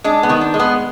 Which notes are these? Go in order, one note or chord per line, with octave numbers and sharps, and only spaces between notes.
G#3 D4
B3
D#3
D4
G#3
B3